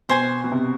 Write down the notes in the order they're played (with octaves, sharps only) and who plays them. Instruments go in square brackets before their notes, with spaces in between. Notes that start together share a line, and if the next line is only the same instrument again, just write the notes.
[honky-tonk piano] B2 [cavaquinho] C5 G#5 C6
[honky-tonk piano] B2
C3